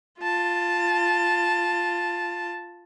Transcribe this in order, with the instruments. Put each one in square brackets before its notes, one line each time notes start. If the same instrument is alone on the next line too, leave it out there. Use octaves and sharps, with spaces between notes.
[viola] F4 A5